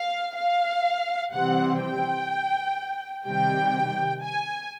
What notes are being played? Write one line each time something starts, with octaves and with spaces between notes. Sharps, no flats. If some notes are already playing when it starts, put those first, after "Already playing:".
Already playing: F5
F5
C3 E3 G3 C4 F#5
G5
C3 D#3 G3 G5
G#5